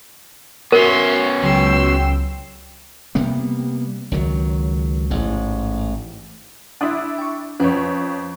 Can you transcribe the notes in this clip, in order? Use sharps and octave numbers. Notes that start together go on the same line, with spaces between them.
B3 C#4 F#4 A#4 E5 C6
C#2 F#3 G5 C6 E6
C3 G3 A#3 B3
C#2 D#3 F#3
A1 G#2
D4 E4 C6 D#6 F#6
G5 C#6
F2 C#4 B4 C#5